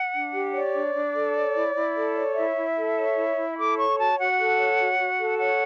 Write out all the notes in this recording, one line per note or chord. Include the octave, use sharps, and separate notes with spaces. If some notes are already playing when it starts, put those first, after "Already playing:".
Already playing: F#5
D4
G4
C#5 D5
D4
D4
A4
C#5
E4
E4
A4
C#5
E4 E5
E4
A4
C#5
E4
E4
A4 D6
C#5 C#6
F#4 A5
F#4 F#5
A4
C#5
F#4
F#4
A4
C#5 F#5